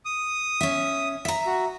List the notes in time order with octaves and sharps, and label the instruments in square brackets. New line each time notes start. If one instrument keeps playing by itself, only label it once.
[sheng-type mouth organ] D#6
[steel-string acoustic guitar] C#4 E5
E5 A#5
[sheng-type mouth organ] F#4